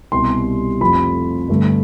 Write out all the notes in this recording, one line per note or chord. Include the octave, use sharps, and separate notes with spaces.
C2 B2 G3 C6
F1 F2 C3 F3 B5
G2 D3 A3